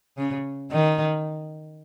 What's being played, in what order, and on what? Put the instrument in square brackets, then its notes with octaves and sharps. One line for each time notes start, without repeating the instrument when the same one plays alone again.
[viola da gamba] C#3
D#3